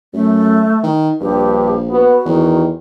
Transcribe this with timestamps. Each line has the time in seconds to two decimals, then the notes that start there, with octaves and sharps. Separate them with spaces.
0.14 F#2 A3
0.83 D#3
1.21 A#1 G2 G4
1.90 B3 F#4
2.25 E2 D#3